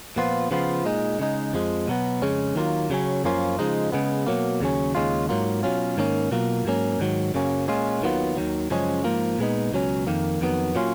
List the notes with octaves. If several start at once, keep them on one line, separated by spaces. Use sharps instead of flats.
A#2 F3 B3 F4
C#3 F3 B3 F4
A#2 G#3 D#4
C#3 G#3 D#4
F2 F3 G#3
B2 F#3 B3
F2 C#3 G#3 C#4
D#2 D#3 F#3 A#3 F4
C#3 F#3 C#4
F#2 F3 A#3 C#4 F4
C#3 F3 G#3 D#4
C#3 G#3 B3
B2 F#3 A#3
D#2 C#3 F#3 C#4
D#2 C#3 G#3 C#4 F4
G#2 F#3 A#3 F4
B2 F#3 C#4 F4
G#2 D#3 A#3 C#4
B2 F#3 A#3 F4
G#2 F#3 A#3 C#4
G#2 D#3 F#3
F#2 C#3 F#3 A#3 C#4
A#2 G#3 C#4 F4
D#2 D#3 F#3 B3 F4
D#2 D#3 F#3
F#2 C#3 F3 G#3 C#4
G#2 F3 A#3 F4
A#2 G#3 B3 D#4
C#2 B2 F#3 C#4
F2 D#3 A#3
F2 D#3 F#3 B3
A#2 F#3 C#4 F4